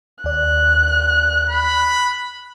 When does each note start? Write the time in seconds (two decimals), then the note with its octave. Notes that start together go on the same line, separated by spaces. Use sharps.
0.24 D#2 D5 F#6
1.50 B5